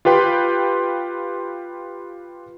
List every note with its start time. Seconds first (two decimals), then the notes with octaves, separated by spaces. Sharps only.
0.05 F4 G4 B4 G5 C6